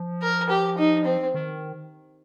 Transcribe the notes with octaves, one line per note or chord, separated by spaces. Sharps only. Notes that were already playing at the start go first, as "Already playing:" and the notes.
Already playing: F3
A#4
G4
D#4
C4
D#3